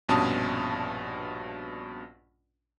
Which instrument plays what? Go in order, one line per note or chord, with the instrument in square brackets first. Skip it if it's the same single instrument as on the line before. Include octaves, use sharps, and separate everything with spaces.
[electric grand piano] A#1 G2 B2 C#4 A5 D#6